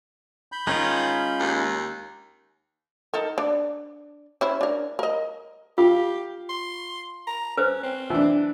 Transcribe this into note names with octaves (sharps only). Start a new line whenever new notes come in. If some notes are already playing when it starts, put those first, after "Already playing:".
B5 G6
D#3 G#3 C#4 F4
D#2
D#4 A4 A#4
D4 D5
C#4 E4 C5
D4 A#4
A#4 D#5
F4 G4 F5
C6
A#5
C#4 B4 C5
C4
E3 D4